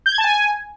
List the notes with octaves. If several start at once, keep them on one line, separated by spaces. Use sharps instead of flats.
G6
G#6
A5
G#5